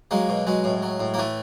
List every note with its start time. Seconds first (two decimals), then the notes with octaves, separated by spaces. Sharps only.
0.11 F#3 G#3 A#3
0.29 B2
0.47 F#3 G#3
0.64 A2
0.82 F#3
1.00 A2
1.14 A#3
1.18 E3 A3